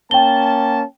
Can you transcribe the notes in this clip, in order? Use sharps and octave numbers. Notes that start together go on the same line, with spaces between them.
A#3 C#4 G5 A5 G7